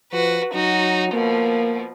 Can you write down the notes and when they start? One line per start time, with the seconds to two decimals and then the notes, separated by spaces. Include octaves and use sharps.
0.13 F3 F#4 B4
0.55 F#3 D#4 F#4
1.13 B2 F3 A#3